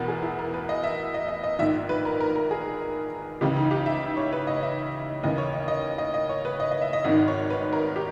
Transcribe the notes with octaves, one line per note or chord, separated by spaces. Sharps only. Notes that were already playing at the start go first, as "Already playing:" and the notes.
Already playing: E2 B2 A#4 B4
G#4
E4
A#4
B4
D#5
E5
D#5
D#5
D#5
A#1 G#2 D#3 E5
B4
A#4
A#4
A#4
G#4
C#2 C#3 E3 G4
D#4
G4
E5
C#5
B4
D#5
E5
D#2 C#3 E3 D#5
C#5
D#5
D#5
D#5
D#5
C#5
B4
D#5
D#5
E5
D#5
G#1 G#2 D#3 D#5
C#5
B4
A#4
G4